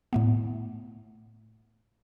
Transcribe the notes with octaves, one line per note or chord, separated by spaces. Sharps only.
A2 A3 B3